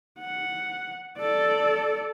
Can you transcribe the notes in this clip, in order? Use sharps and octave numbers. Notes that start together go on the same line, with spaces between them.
F#5
A4 D5